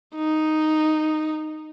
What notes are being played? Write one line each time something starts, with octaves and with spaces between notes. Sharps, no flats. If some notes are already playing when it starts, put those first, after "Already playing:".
D#4